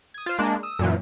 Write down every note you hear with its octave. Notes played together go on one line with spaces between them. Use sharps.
D#6 G#6
F4 C5
G#3 A#3 D4
D#6 E6
F#2 A#2 E3